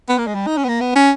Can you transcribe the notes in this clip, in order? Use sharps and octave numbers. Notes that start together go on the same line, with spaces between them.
B3
A#3
G#3
G3
D#4
C#4
B3
A#3
B3
C#4